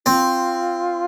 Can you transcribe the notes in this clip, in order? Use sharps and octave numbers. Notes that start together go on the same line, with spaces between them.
C4 F4